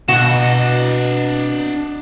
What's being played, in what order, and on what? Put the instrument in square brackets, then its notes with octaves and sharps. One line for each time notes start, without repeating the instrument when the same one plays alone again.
[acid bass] B2 [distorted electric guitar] D4 D#5 [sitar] F#4 [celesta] E7